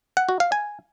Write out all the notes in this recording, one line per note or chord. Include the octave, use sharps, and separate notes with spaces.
F#5
F#4
F5
G#5